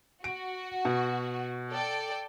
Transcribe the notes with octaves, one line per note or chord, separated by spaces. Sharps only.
F#4 D7
B2
A4 D5 G5